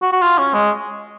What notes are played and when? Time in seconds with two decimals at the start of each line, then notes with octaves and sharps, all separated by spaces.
0.02 F#4
0.12 F#4
0.22 F4
0.38 C#4
0.54 G#3